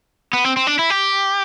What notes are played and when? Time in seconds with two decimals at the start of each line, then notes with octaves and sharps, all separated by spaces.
0.33 B3
0.44 C4
0.57 C4
0.67 D4
0.79 E4
0.90 G4